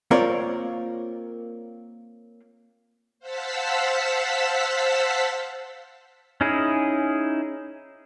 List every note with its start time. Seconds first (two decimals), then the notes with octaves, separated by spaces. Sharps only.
0.11 A#3 C4 F4 A#4 C#5 D5
3.19 C5 F5 F#5 A5 E6 B6
6.41 C#4 D#4 E4 G#4